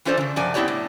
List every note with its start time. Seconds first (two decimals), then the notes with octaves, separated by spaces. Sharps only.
0.05 E3 C#4 F4 A4 C5 D5
0.17 C#3 E3
0.36 F#2 C3 F3 D5 G#5
0.54 B3 C4 E4 G4 C#5 D5
0.68 A2